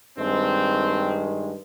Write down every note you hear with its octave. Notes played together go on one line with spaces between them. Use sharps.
G2 D#3 G#3 C4